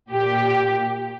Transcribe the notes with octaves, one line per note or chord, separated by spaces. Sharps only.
A#2 G4